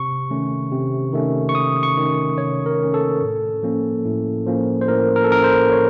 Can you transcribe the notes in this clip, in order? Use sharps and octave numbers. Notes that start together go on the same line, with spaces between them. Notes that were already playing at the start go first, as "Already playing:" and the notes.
Already playing: C3 C#6
D#3 A3 C#4
C3
D#3 A3 C#4
C#6
C3 D#6
C#6
D#3 A3 C#4
C3 C#5
A#4
D#3 A3 C#4
A4
A2
F3 A#3 C#4
A2
F3 A#3 C#4
C5
A2 A#4
A#4
A4
F3 A#3 C#4 A#4
C5
A2 C#5